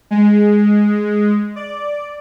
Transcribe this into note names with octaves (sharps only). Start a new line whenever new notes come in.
G#3
D5